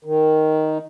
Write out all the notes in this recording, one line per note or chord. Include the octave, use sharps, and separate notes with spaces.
D#3